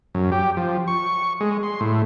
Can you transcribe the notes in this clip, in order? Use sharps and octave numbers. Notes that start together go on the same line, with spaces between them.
F#2
G4
F3
C#6
G#3
C6
A2